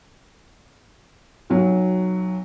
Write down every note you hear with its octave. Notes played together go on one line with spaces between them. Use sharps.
B1 F#3